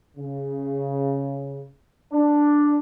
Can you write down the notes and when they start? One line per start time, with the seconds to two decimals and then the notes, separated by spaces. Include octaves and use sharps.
0.17 C#3
2.12 D4